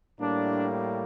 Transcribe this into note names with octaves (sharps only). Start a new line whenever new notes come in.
A2 G3 A#3 D4